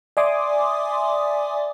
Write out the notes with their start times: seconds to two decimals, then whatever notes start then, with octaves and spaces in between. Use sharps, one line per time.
0.17 D5 E5 G#5 C6 D6 D#6